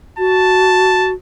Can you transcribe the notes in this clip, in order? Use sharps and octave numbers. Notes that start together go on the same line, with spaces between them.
F#4 A5